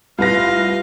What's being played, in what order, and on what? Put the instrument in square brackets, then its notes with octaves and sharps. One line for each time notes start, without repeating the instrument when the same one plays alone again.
[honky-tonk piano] C2 B4 A#6 [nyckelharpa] F4 F5